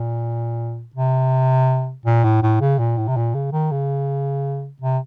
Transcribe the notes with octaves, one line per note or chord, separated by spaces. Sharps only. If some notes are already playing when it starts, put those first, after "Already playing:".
Already playing: A#2
C3
A#2
A2
A2
C#3
A#2
A2
C3
A#2
C#3
D#3
C#3
C3